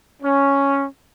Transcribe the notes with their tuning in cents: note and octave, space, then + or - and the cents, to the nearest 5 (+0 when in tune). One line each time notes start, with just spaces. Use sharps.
C#4 +0